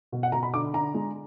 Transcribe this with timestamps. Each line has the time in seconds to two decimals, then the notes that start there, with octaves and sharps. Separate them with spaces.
0.12 B2
0.23 F#5
0.32 B2 A#5
0.43 B5
0.54 D3 D6
0.73 D3 A#5
0.94 G#3